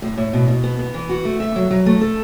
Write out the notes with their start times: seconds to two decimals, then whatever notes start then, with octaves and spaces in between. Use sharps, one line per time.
0.02 A2
0.17 A2
0.33 B2
0.48 B2
0.64 B3
0.79 B3
0.94 E3
1.09 F#4
1.25 A3
1.40 E5
1.56 F#3
1.71 F#3
1.86 A3
2.01 A4